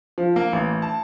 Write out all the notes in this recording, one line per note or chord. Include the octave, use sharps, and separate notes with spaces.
F3
A#3
A1
A5